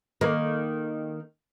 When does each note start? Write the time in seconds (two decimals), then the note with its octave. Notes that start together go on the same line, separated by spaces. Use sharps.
0.21 D#3 A#3